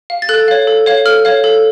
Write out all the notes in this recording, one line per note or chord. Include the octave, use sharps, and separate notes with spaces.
F5
A6
A4 F#6
C#5 F5
A4
C#5 F5
A4 F6
C#5 F5
A4